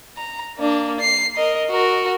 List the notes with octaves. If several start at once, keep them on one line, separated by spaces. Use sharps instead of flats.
A#5
A#3 D4
C7
A#4 D#5
F#4 A#4